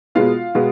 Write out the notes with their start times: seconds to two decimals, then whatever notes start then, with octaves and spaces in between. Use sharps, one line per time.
0.15 B2 G#3 B3 F4 F5
0.55 B2 G#3 B3